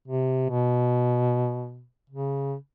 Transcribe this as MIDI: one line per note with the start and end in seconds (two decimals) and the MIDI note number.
0.08 0.46 48
0.49 1.87 47
2.10 2.55 49